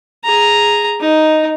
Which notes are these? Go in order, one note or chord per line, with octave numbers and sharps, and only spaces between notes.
G#4 A#5
D#4